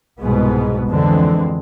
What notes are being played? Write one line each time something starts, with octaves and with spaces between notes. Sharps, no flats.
C2 G#2 B2 G#3 B3
F2 D3 E3 G#3 C4